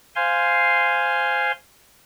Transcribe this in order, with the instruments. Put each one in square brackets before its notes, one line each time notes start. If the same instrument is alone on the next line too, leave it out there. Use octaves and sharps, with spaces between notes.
[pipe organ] C5 F5 G#5 C6